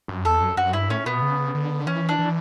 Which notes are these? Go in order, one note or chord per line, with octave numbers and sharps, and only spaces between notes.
F#2
E2 A4
F#2
F#2 F#4
G2 E4
A2 C#4
B2 B3
C#3
D3
E3 C#4
D4
E3